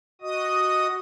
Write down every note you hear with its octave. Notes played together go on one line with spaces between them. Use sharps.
F#4 D#5 D#6